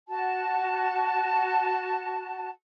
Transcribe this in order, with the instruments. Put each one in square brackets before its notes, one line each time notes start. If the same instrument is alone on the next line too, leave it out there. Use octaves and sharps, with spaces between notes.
[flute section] F#4 A5